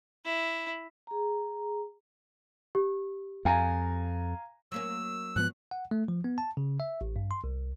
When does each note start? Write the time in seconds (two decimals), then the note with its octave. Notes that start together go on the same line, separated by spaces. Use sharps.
0.25 E4
1.07 G#4 A#5
2.75 G4
3.45 F2 F5 G#5 A#5
4.72 F#3 A#3 C#4 E6
5.36 G#2 F3 B3 F#6
5.71 F#5
5.91 A3
6.08 F3
6.24 B3
6.38 A5
6.57 C#3
6.80 E5
7.01 A1
7.16 G2
7.31 C6
7.44 C2